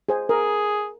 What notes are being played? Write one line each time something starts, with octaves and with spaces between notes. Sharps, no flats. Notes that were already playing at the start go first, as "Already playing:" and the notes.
G#4 C5 G#5
G#4 A#4